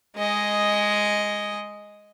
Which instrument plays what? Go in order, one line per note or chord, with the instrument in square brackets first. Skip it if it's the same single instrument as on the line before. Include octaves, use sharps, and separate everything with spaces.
[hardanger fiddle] G#3 D#5